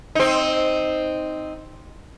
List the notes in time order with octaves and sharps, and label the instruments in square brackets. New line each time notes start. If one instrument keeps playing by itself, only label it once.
[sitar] C4 D#4